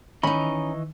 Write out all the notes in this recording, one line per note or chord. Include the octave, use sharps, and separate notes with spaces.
D#3 E3 C#4 D#4 D#5 B5 C#6